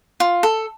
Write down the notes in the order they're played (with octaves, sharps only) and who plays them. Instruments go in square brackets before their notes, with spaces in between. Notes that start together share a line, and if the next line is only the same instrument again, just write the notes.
[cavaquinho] F4
A4